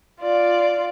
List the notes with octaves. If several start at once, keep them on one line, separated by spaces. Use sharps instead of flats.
F4 D5